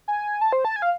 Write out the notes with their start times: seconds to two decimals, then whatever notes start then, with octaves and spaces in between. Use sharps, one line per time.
0.08 G#5
0.41 A5
0.53 C5
0.65 A5
0.76 G#5
0.82 F5